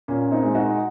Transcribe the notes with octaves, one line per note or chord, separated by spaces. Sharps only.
A#2 A#3 C#4
C4 D#4
G#3
D#4 F#4